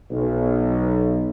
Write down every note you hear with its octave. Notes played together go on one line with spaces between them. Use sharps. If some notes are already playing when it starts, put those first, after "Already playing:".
B1